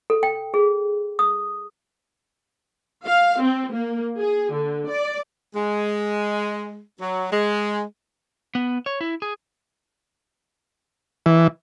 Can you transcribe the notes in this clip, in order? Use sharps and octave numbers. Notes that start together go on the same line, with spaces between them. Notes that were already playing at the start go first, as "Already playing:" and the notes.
A4
G5
G#4
D#6
F5
C4
A#3
G#4
D3
D5
G#3
F#3
G#3
B3
C#5
E4
G#4
E3